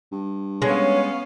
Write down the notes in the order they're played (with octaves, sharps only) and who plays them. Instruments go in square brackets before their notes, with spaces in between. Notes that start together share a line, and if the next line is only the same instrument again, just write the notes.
[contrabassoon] G2
[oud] G#3 [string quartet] B3 C#4 F5 [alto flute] C#5